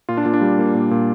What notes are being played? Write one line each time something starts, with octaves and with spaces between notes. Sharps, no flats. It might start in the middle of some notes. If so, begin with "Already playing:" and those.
A#2 F4
D4
A#2
D4
G3
A#3
A#2
A#2